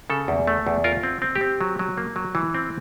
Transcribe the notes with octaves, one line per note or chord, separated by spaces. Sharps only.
C#3 A4
E2
A3
E2
F4 A#4
C4
C4
G4
C4
F#3
F#3
A#3
F#3
E3
C4